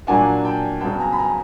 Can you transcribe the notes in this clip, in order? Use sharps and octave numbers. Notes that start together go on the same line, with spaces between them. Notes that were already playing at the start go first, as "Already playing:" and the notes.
A#2 F#3 A#3 D4 F#5 G#5
G5 A5
C#3 F#3 B3 G5 A5
G#5 A#5
B5
G#5 A#5